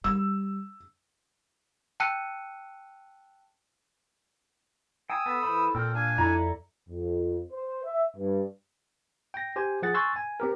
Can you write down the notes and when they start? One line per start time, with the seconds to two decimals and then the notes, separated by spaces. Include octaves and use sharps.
0.04 G3 E6
2.00 G5 A5 E6 F#6 C#7 D#7
5.10 G5 G#5 D#6 E6
5.26 B3 A4
5.43 E3 C5 B5
5.75 A#2 C4 G5 E6 F6
5.95 D4 F5 G#5
6.18 F2 E4 A4 D5 A#5
6.90 F2
7.53 C5
7.85 E5
8.17 G2
9.34 G5 A#6
9.56 G4 C5 G#5
9.82 F3 G#4 F#5 A6
9.94 G#5 C6 C#6 E6 F#6 A6
10.16 G#5
10.40 C4 G4 A#4